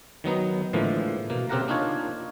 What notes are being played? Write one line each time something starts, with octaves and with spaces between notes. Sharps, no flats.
D#3 F#3 B3 D#4
A2 D3 E3 F3 G#3 A#3
B2 A#3
C#3 C4 G4 A#4 F#5 A#5
A#3 D4 D#4 F4 C#5 G#5